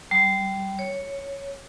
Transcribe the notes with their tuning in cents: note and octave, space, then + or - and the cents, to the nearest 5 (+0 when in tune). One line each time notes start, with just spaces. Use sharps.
G3 -15
C#5 +0